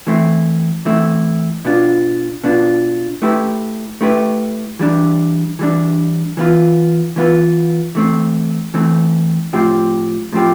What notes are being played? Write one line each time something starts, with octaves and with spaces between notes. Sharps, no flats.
E3 A3 C4 E4
E3 A3 C4 E4
B2 B3 D4 F4
B2 B3 D4 F4
A3 E4 G4 B4
A3 E4 G4 B4
E3 G3 D4
E3 G3 D4
E3 B3 F4 B4
E3 B3 F4 B4
E3 A3 C4
E3 A3 C4
A2 F3 C4 G4
A2 F3 C4 G4